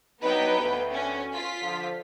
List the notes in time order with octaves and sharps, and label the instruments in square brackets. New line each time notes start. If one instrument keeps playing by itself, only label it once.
[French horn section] G2 F#3 D#4 [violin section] B3 B4 G5
[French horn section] D2
[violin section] C#4
F4 B6
[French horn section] D3 F3